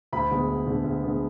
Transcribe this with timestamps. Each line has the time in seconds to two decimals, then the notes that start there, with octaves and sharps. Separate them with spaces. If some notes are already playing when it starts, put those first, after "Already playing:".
0.13 D2 B5
0.31 D3 G#3 B3
0.48 D2
0.67 D3 G#3 B3
0.84 D2
1.02 D3 G#3 B3